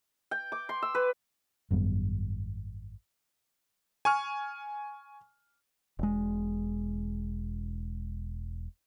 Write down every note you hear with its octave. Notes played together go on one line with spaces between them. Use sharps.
G5
D6
C6
E6
B4
G#1 F#2 G3 B3
G#5 C#6 F6
E1 G#3